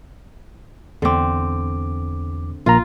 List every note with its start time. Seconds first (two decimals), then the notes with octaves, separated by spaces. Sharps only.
1.02 E2 D3 C4 D6
2.66 A#1 A#3 F4 A#5